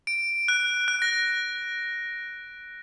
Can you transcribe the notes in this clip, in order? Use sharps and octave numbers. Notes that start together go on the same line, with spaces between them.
D7
F#6
F#6
A#6